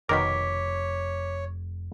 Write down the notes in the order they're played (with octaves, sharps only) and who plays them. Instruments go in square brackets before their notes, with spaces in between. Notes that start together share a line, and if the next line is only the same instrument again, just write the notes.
[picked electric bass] F1 [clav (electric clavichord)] B2 D#3 A#4 [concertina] C#5 [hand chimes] D6 B6